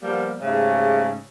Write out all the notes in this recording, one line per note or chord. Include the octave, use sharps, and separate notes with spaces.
F3 G3 A#3 B3
G#2 C#3 G3 A3